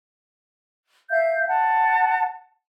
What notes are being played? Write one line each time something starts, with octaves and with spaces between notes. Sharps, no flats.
E5 F5 G6
F#5 A5